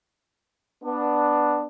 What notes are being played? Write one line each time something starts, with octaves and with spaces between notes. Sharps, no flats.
B3 D4